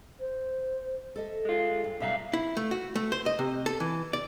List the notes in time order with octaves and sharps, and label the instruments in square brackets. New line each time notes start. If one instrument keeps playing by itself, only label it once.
[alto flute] C5
[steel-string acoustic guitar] A4 D#5 E5
[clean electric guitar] G#3 F4
[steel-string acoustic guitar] G2
[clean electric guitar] F#2 E5 F5 [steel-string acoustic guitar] B2 G3 A#5
[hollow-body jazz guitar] E4
A3
F#4
A3
C5
D#5
C3
A4
E3
D5